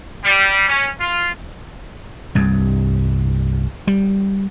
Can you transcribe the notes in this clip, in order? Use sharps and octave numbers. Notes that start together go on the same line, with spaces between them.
G3
C#4
F4
C2 G2
G3